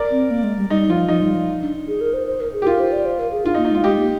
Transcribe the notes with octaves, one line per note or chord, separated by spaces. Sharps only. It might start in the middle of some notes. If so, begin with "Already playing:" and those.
Already playing: A#4 D5
C4
A#3
G#3
G3
G3 D#4
F3 F4
F3 D#4
G3
F3
D4
G#4
A#4
C5
C5
A#4
G#4
G4
F4 A#4
C5
D5
C5
A#4
G#4
D4 F4
D#4
A#3
D#4
G#3 F4
G#3 D#4 G4
A#3